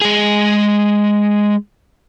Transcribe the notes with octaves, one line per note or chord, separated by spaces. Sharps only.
G#3 G#4